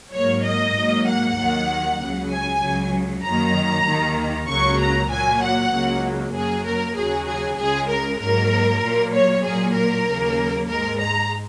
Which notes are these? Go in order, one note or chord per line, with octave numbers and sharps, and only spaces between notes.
G#2 F#3 A#3 C#5
D#5
G#2 F#3 A#3
F#5
D#2 D#3 F#3 A#3
C#2 C#3 F#3
G#5
C#2 C#3 F#3
F#2 D#3 F#3 A#3 A#5
D#2 D#3 A#3
C#2 C#3 F#3 A#3 C#6
A#5
A#2 F#3 A#3 G#5
F#5
C#2 C#3 F#3 A#3
F#2 F#3 A#3 G#4
A#4
D#2 C#3 F#3 G#4
G#4
C#2 C#3 G#3 G#4
A#4
G#2 F#3 A#3 A#4
A#2 F#3 A#3
C#5
A#2 F#3 A#3 G#4
A#4
D#2 C#3 F#3 A#3
G#2 G#3 A#4
A#5